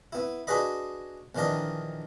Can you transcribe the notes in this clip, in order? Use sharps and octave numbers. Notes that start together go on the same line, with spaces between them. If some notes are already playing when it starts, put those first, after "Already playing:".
B3 E4
D4 F#4 G#4 B4 D#5 B5
A#1 D#3 E3 D4 D#5